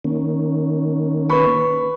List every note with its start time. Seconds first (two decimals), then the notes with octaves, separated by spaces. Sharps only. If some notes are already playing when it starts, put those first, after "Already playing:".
0.04 D#3 A#3 C#4
1.29 B4 B5 C#6